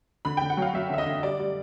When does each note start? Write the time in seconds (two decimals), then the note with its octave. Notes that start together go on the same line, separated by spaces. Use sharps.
0.25 D3 B5
0.37 D3 G5
0.50 F#5
0.57 F#3 F5
0.74 F#3 E5
0.90 D3 E5
0.98 D#5
1.06 D3
1.23 G3 D5
1.40 G3